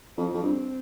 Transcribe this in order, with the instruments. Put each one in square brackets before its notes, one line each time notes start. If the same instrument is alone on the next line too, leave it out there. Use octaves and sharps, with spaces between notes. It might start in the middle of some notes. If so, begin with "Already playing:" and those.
[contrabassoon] F2 [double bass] C4
[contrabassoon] F2
G2